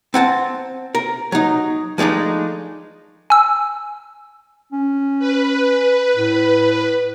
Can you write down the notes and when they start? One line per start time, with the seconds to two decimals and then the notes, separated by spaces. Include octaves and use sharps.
0.14 C4 F#5 G#5 A5
0.95 A#4
1.32 F#3 D#4
1.98 F3 G#3 A3 D4 D#4
3.30 G#5 E6
4.72 C#4
5.19 B4
6.15 A2